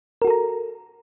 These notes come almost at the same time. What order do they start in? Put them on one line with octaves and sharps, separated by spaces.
A#4 F#4 A4 A#5